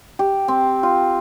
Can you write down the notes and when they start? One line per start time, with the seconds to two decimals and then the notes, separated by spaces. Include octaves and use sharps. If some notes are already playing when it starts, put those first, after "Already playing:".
0.19 G4
0.48 C4
0.83 F4